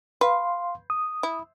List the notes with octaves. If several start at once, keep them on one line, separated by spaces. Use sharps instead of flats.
B4 F5 C6
D#6
E4